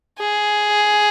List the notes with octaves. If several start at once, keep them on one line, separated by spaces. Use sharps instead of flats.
G#4